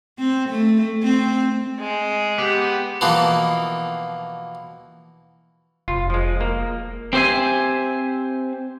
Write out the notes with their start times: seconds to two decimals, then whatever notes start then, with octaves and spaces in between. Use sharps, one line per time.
0.19 C4
0.50 A3
1.03 C4
1.79 G#3
2.38 B3 G4
3.01 B2 E3 F3 A#3
5.88 F1 F4
6.10 F3 G#3
6.41 A#3
7.13 C4 G4 C5 E5 G#5